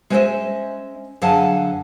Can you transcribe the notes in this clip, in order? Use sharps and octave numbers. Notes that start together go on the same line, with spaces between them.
G#3 C#4 C5 C#5 D#5 E5
F#2 D3 G#4 F5 F#5 A5